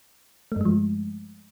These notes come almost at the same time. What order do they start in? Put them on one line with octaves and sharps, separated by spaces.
A3 G2 G#3 F3